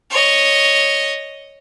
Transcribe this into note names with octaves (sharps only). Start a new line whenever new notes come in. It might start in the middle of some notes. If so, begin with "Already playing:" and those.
C#5 D#5